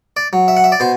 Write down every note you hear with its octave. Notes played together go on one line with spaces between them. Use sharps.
D5
F#3
E5
F#5
E5
D5
B2 C5